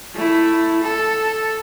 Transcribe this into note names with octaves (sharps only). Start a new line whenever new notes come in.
A3 E4
A4